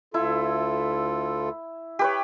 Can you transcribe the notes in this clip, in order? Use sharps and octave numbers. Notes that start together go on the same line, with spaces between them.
D2 E4 F4 A4
G4 B4 C#5